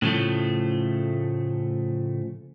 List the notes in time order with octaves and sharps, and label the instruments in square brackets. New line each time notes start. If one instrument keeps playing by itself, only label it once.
[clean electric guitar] A2 C#3 F3 A3